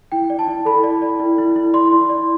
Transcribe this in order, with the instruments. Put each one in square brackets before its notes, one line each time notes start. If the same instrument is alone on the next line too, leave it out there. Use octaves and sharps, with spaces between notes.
[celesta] E4 G5
D5
A5
E4
A4 B5
D5
D5
E4
E4
E4
D5 C6
E4
D5